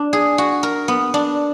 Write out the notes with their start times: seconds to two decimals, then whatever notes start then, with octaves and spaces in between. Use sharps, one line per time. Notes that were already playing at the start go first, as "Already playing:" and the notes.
Already playing: D4
0.13 G#4
0.38 F#4
0.63 A#4
0.88 B3
1.14 D4